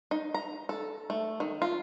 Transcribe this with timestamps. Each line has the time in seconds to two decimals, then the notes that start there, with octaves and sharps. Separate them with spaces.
0.11 D#4
0.34 A#5
0.69 A4
1.10 A3
1.40 D#3
1.62 F4